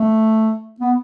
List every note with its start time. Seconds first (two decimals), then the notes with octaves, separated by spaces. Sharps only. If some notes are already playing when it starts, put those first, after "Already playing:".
Already playing: A3
0.80 B3